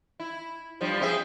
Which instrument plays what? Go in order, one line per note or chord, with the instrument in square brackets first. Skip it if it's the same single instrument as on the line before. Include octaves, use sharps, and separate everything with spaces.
[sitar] E4
G2 F3 G3
C4 G#4 E5